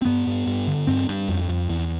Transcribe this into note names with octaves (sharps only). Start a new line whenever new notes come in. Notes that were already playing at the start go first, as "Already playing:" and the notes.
C4
G2 B3
G2
G2
D3
G2 C4
G2
F2
F2
E2